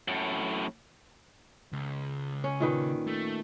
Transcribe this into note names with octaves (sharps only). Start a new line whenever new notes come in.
F#2 A2
C#2
C#4
A#2 D#3 B4
A3